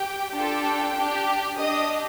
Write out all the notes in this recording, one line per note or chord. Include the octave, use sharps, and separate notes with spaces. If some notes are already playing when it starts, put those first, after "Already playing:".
Already playing: G4 G5
D4 F4 G4 A4 G5
D4 G4
D4 G4 D#5 D#6